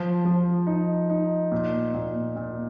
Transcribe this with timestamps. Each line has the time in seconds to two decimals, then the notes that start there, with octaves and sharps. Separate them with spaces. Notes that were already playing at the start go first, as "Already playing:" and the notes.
Already playing: F3
0.25 F3
0.67 D#4
1.10 D#4
1.52 A#2
1.94 A#2
2.36 A#2